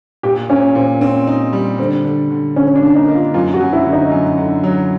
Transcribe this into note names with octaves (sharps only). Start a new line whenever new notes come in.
A#2 G4
A#2 C#4
A#2 C4
C4 C#4
D#4
G3
D3 C4
D3
D3
D3 C#4
D4
A#3
D#4
A#3
F4
F#2 F4
F#4
F#2
E4
D3
D#4
F#2
D3
F#3